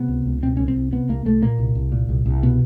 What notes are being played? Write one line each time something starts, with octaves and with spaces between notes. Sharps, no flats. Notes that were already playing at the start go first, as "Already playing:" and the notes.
Already playing: C3 B3
C#2
C#2
B2 C4
C2 C#4
C4
C2
C3 B3
C2 A#3
C2 A3
A#2 A#3
C2
C2
A#2
C2
C2
B2 B3